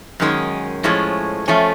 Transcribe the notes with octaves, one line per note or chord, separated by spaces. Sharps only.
F#2 D#3 G#3 C#4
A2 F3 G#3 C#4
F3 A3 C#4